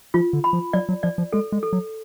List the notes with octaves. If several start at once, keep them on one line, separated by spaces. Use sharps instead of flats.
F3 F4
D3
B5
F3
F#3 D5
F#3
F3 D5
F3
G#3 A4
G#3
A4
F#3